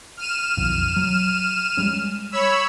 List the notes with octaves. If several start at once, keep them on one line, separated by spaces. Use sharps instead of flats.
F6 D#7 E7
B1 F2
F#3
G3 G#3 C#4
C#5 B5 E6